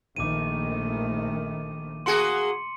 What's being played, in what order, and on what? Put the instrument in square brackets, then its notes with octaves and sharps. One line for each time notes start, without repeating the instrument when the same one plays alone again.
[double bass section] A#1 D#3 A3 [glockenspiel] D6 D#7
[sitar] A#3 F#4 G#4 [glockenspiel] C6 C#7